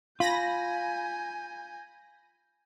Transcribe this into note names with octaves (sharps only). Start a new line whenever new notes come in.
F4 G#5 B5 G6 A#6